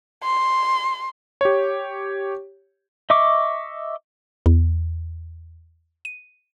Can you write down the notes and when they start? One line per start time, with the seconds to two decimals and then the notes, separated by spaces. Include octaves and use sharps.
0.23 C6
1.41 G4 C#5
3.10 D#5 E5 C#6 D6
4.46 E2
6.05 D#7